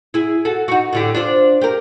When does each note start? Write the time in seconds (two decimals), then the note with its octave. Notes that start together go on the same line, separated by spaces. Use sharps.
0.14 E4 G#4
0.45 F#4 A4
0.68 D#4 F#4
0.93 A2 D3 G4
1.15 D4 F4 C5
1.61 G4 A#4